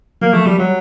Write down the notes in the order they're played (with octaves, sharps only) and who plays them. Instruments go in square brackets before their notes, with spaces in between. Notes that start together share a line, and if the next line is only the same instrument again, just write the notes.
[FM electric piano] F#3 [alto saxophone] A#3
[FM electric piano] F3 [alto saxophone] A3
[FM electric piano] F#3 [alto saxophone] G3
[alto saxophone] F#3 [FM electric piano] G3